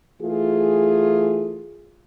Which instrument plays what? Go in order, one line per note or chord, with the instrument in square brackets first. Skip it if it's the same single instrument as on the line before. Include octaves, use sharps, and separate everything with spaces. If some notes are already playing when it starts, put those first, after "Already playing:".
[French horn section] E3 A3 F4 G#4